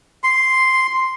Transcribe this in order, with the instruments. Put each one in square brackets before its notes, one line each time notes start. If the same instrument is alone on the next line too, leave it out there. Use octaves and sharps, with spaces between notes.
[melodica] C6